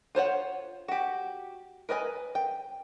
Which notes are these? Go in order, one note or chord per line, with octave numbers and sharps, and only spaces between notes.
F4 C5 C#5 F#5
F#4 G4
A#4 B4 D#5 G#5
G5